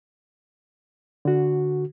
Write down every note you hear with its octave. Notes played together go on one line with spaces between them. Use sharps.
D3 F#4